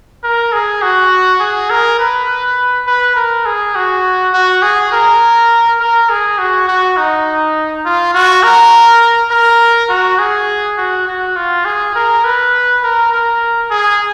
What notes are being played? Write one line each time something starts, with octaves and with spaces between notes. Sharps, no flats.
A#4
G#4
F#4
G#4
A#4
B4
B4
A#4
G#4
F#4
F#4
G#4
A#4
A#4
G#4
F#4
F#4
D#4
F4
F#4
A#4
A#4
F#4
G#4
F#4
F#4
F4
G#4
A#4
B4
A#4
A#4
G#4